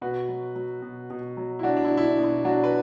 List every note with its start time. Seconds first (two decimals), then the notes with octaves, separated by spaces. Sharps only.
0.01 B2 F#4 B4
0.29 F#3
0.55 F#3
0.82 B2
1.10 B2
1.37 F#3
1.59 E4
1.63 F#3 D4 F#4
1.77 D4
1.85 E4
1.91 B2
1.97 E4
2.04 D4
2.18 B2
2.24 E4
2.44 F#3 D4 F#4
2.64 B4